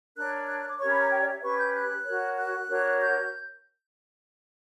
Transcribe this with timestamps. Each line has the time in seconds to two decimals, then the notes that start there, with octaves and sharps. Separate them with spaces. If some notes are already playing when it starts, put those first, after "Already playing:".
0.16 D4 A#4 C#5 F#6
0.48 F#6
0.58 F#6
0.69 D6
0.80 C#4 G4 A#4 C#5 C#6
0.90 B5
1.00 A#5
1.11 G5
1.22 D5
1.32 E5
1.42 C#4 G4 B4 C#6
1.58 G6
1.74 F#6
2.05 F#4 A#4 C#5
2.38 F#6
2.68 D4 F#4 A#4 C#5
3.00 G6